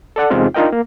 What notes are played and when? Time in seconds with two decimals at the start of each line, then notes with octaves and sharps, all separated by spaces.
0.16 A4 D5 F#5
0.30 E2 C3 G#3 C4 D#4 F4
0.54 D4 D#4 F4 A#4 D#5 G5
0.72 A#3